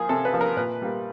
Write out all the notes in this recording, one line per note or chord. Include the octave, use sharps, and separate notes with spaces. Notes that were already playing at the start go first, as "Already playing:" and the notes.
Already playing: F3 A#3 G#4
C3 A4
B4
F3 A#3
A#4
A#2 B4
G3 A#3